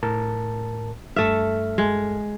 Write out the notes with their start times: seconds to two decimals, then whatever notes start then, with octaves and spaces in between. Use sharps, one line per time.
0.03 A2 A#4 A5
1.16 G2 A3 A4 E5 F6
1.78 G#3